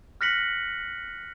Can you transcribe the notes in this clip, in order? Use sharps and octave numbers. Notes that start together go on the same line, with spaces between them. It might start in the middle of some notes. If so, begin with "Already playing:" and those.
F6 F#6 A#6 B6 C#7 F#7